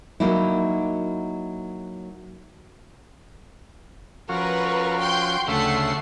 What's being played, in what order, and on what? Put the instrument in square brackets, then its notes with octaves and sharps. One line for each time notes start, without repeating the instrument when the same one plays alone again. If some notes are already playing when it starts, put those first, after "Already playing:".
[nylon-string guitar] F#3 A#3 D#4 E4
[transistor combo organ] F3 C#4 F#4 [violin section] A#4 B4
[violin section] G5 C6 G6
[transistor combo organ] D2 C#3 E6 [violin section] A3 F#5 C7